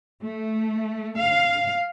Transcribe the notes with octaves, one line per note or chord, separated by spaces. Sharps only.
A3
F5